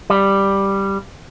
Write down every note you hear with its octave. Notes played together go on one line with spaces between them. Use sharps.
G3